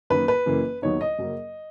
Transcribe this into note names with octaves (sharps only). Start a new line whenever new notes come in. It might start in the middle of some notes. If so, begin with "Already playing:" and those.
F#2 D#3 A#3 B4
B4
F#1 F#2 E3 A#3
D#2 D#3 F#3 B3 D#4 C#5
D#5
F#2 C#3 F#3 A#3